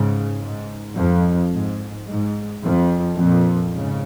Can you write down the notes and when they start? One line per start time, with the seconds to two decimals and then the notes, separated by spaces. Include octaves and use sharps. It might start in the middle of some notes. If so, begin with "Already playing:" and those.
Already playing: G#2 C#3
0.42 G#2
0.97 F2
1.53 G#2
2.07 G#2
2.64 F2
3.18 F2 A#2
3.74 G#2 C#3